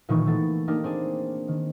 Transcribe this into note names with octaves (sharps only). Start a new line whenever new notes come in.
A#2 D#3 E3 D#4 C#6
E3 A3 B3 A4 A6
A#3 D4 D#4 G4 A#4
C4 D4 G#4 D5
D#3